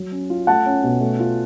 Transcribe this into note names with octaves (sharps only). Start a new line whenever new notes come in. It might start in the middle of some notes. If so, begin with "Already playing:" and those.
Already playing: F#3
C#4
F4
A3 F#5 A5
C#4
B2
A3
F4